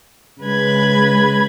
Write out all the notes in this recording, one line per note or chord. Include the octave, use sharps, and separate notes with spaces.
C#3 G#3 B4 B5 G#6